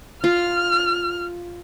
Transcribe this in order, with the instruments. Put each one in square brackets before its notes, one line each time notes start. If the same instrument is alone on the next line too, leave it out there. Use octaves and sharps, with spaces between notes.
[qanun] F4 [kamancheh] F6